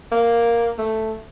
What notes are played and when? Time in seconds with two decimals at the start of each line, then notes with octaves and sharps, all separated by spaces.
0.12 A#3
0.78 A3